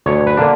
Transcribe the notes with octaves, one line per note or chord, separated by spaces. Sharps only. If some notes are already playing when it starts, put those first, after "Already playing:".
D2 C#5
B4
D3 A#3 D4